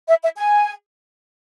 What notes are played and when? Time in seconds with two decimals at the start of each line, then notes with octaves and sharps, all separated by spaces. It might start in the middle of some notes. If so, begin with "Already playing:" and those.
0.08 E5
0.23 E5
0.37 G#5